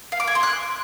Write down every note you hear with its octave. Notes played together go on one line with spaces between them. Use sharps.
F5
D6
G#5
C6
F#6